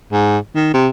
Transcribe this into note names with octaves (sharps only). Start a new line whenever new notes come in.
G#2
D#3
C3